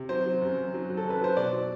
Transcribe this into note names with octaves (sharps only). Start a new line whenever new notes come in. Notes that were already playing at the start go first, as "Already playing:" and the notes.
Already playing: C3
F#3 C5
F#3
F#2
F#2
F#3
F#3
A4
F#2
B4
F#3 C5
B2 D5
F#3